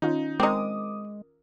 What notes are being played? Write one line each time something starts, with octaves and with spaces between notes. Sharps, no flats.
D#3 C#4 D#4 F4
G#3 C4 D#4 A#4 D6 D#6